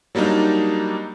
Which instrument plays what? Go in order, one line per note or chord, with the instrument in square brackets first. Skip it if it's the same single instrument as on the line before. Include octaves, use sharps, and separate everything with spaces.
[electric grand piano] F#3 G3 A#3 D4 D#4